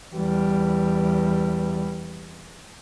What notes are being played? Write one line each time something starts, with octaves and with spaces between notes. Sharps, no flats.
E2 G3